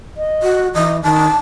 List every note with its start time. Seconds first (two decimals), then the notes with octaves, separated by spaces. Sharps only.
0.17 D#5
0.43 F#4
0.74 E3 D#5
1.03 D#3 A5